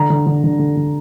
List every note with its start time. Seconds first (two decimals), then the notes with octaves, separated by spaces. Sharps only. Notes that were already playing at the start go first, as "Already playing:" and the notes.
Already playing: D3 A#5
0.10 D3
0.26 D3
0.44 D3
0.59 D3
0.77 D3